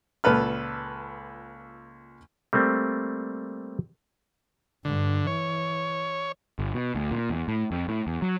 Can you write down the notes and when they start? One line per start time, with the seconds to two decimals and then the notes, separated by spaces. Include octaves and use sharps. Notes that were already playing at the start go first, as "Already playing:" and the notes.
0.24 C#2 A#2 A4 B4 F6
2.53 G3 A3 A#3 C4
4.85 G2 D3
5.27 E3 C#5
6.59 G1
6.74 B2
6.95 D2
7.12 A#2
7.30 E2
7.48 A2
7.71 F2
7.88 A2
8.07 E2
8.22 F#3